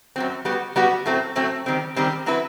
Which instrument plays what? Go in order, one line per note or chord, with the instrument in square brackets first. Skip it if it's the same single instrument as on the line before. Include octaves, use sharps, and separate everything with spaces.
[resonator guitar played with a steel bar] F#2 F#3 C4
G3 B3 F#4
G3 B3 F#4
A2 F#3 A3 C4
A2 F#3 A3 C4
D#3 G3 C4
D#3 G3 C4
F#3 C4 E4 B4